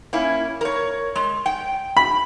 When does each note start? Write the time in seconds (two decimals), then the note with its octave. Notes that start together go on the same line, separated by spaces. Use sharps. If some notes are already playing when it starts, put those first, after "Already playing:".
0.13 A#3 C#4 E4
0.61 A#4 C#5
1.15 G#3
1.46 G5
1.97 B5